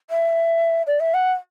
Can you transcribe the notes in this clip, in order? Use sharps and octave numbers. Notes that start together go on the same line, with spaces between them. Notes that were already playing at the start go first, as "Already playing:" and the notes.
E5
D5
E5
F#5